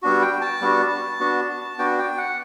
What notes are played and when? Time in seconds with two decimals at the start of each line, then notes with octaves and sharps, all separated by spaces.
0.02 G3 B3 D4 F#4
0.22 G5
0.41 A5
0.61 G3 B3 D4 F#4
1.20 B3 D4 F#4
1.78 B3 D4 F#4 G5
1.98 G5
2.18 F#5